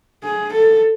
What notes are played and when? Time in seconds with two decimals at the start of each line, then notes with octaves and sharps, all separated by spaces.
0.24 G#4
0.52 A4